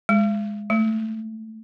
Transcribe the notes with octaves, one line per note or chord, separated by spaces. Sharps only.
G#3
A3